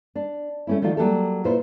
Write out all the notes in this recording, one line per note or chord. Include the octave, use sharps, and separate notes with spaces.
D4
A3 C#4 E4
D#3 F3 A3 D4 F4 F#4
F#3 G3 A#3 G4 A4
A#2 E4 F4 B4 C5